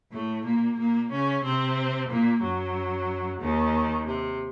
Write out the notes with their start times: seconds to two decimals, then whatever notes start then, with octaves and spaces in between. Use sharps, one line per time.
0.12 A2 A3
0.45 A#2 A#3
0.77 A#2 A#3
1.10 C#3 C#4
1.43 C3 C4
2.09 A#2 A#3
2.42 F#2 F#3
3.40 D#2 D#3
4.06 C3